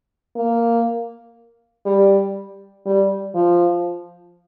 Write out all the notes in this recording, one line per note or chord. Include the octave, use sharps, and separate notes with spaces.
A#3
G3
G3
F3